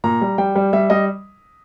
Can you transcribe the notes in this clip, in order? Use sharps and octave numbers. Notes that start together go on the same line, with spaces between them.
A#2 A#5
G3
G3 G5
G3
G3 E5
G3 D#5